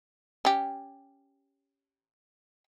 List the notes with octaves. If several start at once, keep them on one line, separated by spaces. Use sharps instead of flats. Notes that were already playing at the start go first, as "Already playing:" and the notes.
C#4 G4